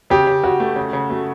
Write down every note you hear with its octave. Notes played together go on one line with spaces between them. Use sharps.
C#3 G4
C#3
C#3 F#4
A3
C#3
C#3
A3 F#4